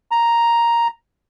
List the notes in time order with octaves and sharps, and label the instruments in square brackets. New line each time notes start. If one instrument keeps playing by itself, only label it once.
[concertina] A#5